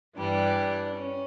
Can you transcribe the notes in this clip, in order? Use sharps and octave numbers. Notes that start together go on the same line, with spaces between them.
G2 E3 G3 D4
C#4